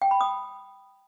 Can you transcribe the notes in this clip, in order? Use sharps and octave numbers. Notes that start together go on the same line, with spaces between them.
G5
B5
D#6